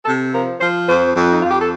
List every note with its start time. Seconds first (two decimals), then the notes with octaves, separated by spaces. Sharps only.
0.05 C3 A4
0.33 F3 A#4
0.60 F3 C5
0.87 F2 C5
1.15 F2
1.33 D#4
1.42 F2 F4
1.51 G4
1.60 A4